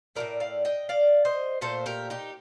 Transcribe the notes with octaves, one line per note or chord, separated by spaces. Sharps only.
A2 F3 A3 A#4 D5
D5 F5
D#5 G5
D5 F5
C5 D#5
A#2 A3 A4 C5
G4 A#4
D#4 G4